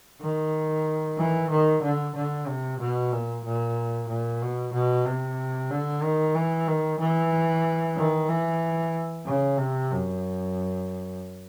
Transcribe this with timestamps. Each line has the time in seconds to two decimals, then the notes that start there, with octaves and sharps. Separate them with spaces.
0.21 D#3
1.18 E3
1.51 D#3
1.83 D3
2.15 D3
2.47 C3
2.80 B2
3.12 A#2
3.44 A#2
4.08 A#2
4.42 B2
4.73 B2
5.06 C3
5.71 D3
6.03 D#3
6.35 E3
6.68 D#3
7.00 E3
7.96 D#3
8.29 E3
9.26 C#3
9.58 C3
9.91 F#2